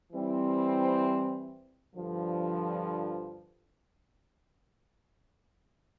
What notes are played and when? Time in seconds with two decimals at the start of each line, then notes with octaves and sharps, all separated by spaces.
0.13 E3 G3 C4 E4
1.95 G2 D3 F3